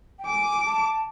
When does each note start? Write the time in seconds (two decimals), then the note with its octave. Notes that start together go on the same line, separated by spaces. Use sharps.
0.19 G5
0.26 G#5 D6
0.65 A5